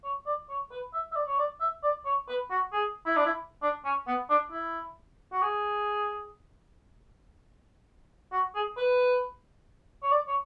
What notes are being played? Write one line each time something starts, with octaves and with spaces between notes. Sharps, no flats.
C#5
D5
C#5
B4
E5
E5
D5
C#5
D5
E5
D5
C#5
B4
F#4
G#4
E4
D4
E4
D4
C#4
B3
D4
E4
F#4
G#4
F#4
G#4
B4
C#5
D5
C#5